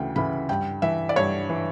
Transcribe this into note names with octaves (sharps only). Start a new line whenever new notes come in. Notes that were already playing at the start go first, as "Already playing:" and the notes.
Already playing: D2 C#3 E3 G5
C#3 E3 B5
G2 G5
E3 E5
D5
G2 C#5
E3